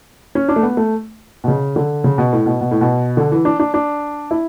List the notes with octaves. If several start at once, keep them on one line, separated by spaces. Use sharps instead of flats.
C#4
D4
A3
B3
A3
B2
C#3
D3
C#3
B2
A2
B2
B2
A2
B2
D3
E3
D4
D4
D4
E4